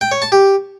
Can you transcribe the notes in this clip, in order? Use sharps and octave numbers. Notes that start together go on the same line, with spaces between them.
G5
C#5
A5
G4